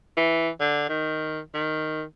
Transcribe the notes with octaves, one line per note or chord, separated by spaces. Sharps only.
E3
D3
D#3
D#3